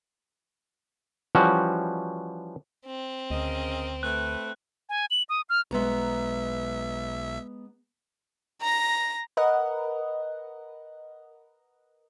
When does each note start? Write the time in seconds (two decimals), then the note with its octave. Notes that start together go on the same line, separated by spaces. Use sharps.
1.35 E3 F3 G3 C#4 F#4
2.86 C4
3.30 D2 C#3 A#4 D#5
4.03 A3 B4 F#6
4.89 G#5
5.11 F#7
5.29 D#6
5.49 F6
5.71 B1 G#3 B3 E5 A#5
8.61 A#5 A#6
9.37 A#4 B4 D#5 F#5